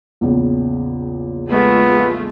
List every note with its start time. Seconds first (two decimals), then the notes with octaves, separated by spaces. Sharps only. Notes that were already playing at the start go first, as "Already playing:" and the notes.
0.21 A#1 E2 C#3
1.48 G#3 A3 B3 F4